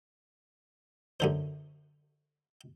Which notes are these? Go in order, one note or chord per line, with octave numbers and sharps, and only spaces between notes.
F#2 D3 C5